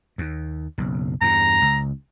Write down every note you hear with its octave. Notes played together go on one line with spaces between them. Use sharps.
D#2
F#1 B1
E2 G2 A#5
C#2